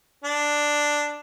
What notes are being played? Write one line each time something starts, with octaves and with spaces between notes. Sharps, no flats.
D4